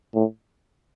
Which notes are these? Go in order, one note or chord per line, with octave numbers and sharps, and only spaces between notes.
A2